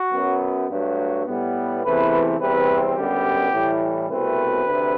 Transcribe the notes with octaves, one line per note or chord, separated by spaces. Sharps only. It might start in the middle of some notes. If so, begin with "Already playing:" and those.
Already playing: F#4
F#2 F#3 B3
G2 F#3 A3
A2 G3 B3
E2 C3 E3 A3 B4
E2 C3 G3 C4 B4
F#2 D3 G3 B3 G4
A2 E3 G3
C2 B2 A3 C4 B4
D2 C3